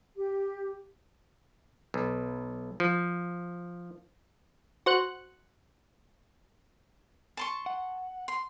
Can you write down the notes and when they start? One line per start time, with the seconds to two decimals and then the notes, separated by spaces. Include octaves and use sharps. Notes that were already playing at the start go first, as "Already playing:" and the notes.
0.16 G4
1.94 B1
2.80 F3
4.86 F#4 C5 F#6 C#7
7.37 A5 C6 C#6
7.66 F#5
8.28 C6